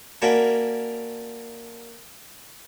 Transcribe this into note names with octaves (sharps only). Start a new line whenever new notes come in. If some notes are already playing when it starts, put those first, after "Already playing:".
A#3 C#4 D4 E4 F#4